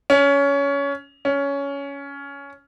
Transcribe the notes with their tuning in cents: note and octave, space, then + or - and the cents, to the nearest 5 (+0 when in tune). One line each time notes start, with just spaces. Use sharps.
C#4 +20
C#4 +15